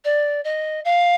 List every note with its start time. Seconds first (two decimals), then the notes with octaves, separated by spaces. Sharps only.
0.04 D5
0.44 D#5
0.85 F5